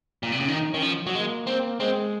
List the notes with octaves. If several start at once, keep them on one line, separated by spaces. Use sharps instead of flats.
A#2
C3
C#3
D#3 D#4
D#3 C#4
F3
F#3
G#3 A#3
C4
G#3 C4